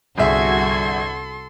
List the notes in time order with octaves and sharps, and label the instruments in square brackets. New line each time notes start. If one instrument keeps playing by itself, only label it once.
[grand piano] G1 G#4 E5 [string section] C2 F#4 G#6 [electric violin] A4 C6